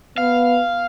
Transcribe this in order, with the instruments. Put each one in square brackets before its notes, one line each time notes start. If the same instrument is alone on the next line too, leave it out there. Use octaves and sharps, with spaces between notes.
[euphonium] B3 [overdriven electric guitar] F5